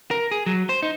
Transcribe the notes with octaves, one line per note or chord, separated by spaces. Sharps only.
A#4
G#4
F#3
C5
D#4